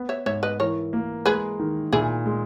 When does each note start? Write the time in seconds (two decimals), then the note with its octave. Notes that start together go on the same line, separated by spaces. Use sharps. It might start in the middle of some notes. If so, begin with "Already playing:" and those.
Already playing: B3
0.09 C#5 E5
0.26 G#2 C#5 E5
0.43 B4 D#5
0.59 E3 A#4 C#5
0.93 A#3
1.26 G#3 G#4 B4
1.59 D#3
1.93 A#2 E4 G#4
2.26 G#3